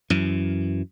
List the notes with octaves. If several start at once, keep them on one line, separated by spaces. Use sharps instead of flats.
F#2 E3